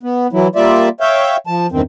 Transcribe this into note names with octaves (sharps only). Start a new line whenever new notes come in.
B3
E3 F#3 E4
G3 A#3 F4 D5 E5
C#5 E5 F5 G5
F3 A5
E2 G2 D#3 C4